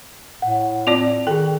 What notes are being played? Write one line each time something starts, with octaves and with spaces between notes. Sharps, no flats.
A2 F#5
C4 F4 D5 F7
D#3 G#4 A4 G5